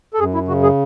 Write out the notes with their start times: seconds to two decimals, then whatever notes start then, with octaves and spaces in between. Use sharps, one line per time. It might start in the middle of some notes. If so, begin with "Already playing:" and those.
0.14 A4
0.19 F#2 G#4
0.34 E4
0.48 C#3 F#4
0.63 G#4